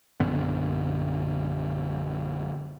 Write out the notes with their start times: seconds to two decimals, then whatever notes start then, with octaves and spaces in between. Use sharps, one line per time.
0.20 A#1 F#2 D3 B3